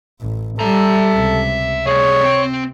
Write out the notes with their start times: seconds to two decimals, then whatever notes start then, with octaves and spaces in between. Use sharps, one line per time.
0.21 A1
0.59 G3 A4 E5 A#5
1.13 C#2 C3
1.87 C3 G3 G#4 C#5
2.23 C4 G5